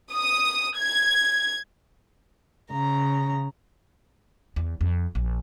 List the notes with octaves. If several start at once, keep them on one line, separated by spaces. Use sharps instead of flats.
D#6
G#6
C#3 A#5
E2
F2
A#1